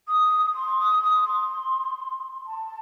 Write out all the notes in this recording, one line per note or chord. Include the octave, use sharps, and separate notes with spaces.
D#6
C6
D#6
D#6
C6
A5